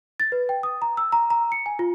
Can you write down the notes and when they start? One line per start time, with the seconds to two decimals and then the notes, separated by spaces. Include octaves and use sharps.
0.20 A6
0.32 B4
0.49 G5
0.63 D#6
0.82 A#5
0.97 E6
1.12 A#5
1.30 A#5
1.52 C#7
1.66 G#5
1.79 F4